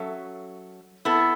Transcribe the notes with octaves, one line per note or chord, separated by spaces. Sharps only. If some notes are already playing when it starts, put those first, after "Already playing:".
Already playing: F#3 C#4 A4 E5
B3 E4 A4